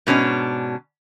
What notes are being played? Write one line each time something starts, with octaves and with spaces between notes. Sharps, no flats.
G#2 B2 C#4 D4